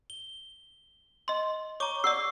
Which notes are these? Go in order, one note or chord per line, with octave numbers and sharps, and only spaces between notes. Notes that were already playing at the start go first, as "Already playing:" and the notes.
G7
D#5 C6
C#5 A#5 C#6 D6 G7
D5 F#5 C#6 E6 C7